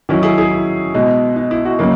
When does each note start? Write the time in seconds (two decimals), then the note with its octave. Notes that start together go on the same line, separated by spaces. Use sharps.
0.09 D#3 F#3 C#4 E4
0.23 E4 G#4
0.38 E4 G#4
0.51 E4
0.94 B2 G#3 D#4
1.36 D#4
1.51 E4
1.65 D#4 F#4
1.79 C#3 F#3 A#3 D#4